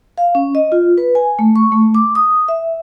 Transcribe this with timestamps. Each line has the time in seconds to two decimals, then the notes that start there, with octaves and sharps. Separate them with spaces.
0.18 F5
0.35 C#4
0.55 D#5
0.72 F4
0.98 B4
1.15 G#5
1.39 A3
1.56 C#6
1.72 A3
1.95 D6
2.15 D#6
2.48 E5